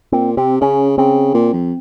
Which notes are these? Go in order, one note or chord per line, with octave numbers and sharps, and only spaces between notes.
A#2 C4
C3 C4
C#3 C#4
C#3 C4
A#2
F2